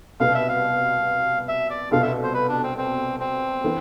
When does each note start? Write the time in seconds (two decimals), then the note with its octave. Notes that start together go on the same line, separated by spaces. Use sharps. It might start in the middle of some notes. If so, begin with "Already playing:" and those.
0.20 C2 B2 B3 F5
0.35 E5
0.49 F5
1.48 E5
1.70 D5
1.91 C2 B2 B3 F4 A4 F5
2.02 E5
2.23 C5
2.34 B4
2.49 D4
2.63 C4
2.78 C4
3.20 C4
3.64 E3 B3